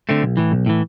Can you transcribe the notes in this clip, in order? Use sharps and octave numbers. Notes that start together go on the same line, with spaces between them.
D3 A3 C4
B1
A2 E3
B1
A2 E3